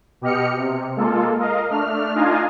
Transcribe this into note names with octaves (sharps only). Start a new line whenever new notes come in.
B2 G4 D#5 F6 C#7
C3
G#3 A#3 F4 A4
A#4 D#5 F5
A3 D4 F6
D4 D#4 F4 D#5 F5 G#5